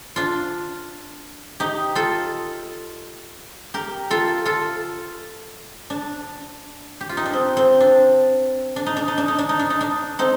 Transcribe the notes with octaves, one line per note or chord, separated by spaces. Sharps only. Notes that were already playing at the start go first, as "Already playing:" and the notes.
D4 F4
D#4 G4
F4 A4
G4 A#4
F4 A4
F4 A4
D4
G4
F4
D#4
D4
C4
C4
D4
D4
D#4
D4
D#4
D4
D#4
D4
D#4
D4
D#4
D4
C4 D#4